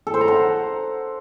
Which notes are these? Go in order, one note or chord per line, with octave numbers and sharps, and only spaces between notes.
A4
C5
A#5
F#5